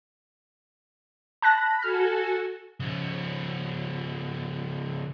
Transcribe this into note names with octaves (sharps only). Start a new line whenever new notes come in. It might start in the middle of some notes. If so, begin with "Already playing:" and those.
A5 B5 F#6 A#6
F#4 A4 G#5 F6
C#3 F3